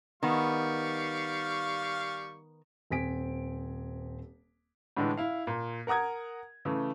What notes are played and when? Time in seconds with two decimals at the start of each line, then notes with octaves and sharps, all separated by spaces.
0.23 D#3 G3 B3 F5 C#6
2.90 D#1 C4 G#5 B6 D7
4.97 A2 D3 E3 G#3 D4
5.17 E4 F5
5.47 A#2
5.87 A#4 F#5 A#5 D#6 G#6
6.65 C#3 E3 A3